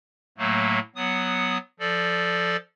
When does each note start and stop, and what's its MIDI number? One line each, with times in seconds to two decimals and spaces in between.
0.38 0.79 45
0.38 0.79 54
0.38 0.79 57
0.38 0.79 58
0.96 1.58 54
0.96 1.58 59
0.96 1.58 87
1.80 2.57 53
1.80 2.57 69
1.80 2.57 74